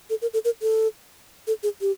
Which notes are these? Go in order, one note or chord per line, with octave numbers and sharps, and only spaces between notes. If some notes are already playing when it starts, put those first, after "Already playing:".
A4
A#4
A4
A#4
A4
A4
G#4
G4